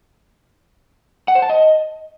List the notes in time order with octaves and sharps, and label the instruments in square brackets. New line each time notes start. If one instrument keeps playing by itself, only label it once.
[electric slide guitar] F#5
C5
A5
D#5